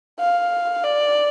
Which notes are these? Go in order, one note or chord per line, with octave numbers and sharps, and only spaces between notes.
F5
D5